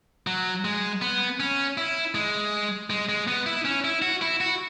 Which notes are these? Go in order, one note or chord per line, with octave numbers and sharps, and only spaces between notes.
F#3
G#3
B3
C#4
E4
G#3
G#3
G#3
B3
E4
C#4
E4
F#4
E4
F#4